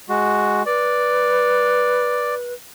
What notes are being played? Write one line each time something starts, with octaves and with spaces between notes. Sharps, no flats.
G#3 F#4
B4 D5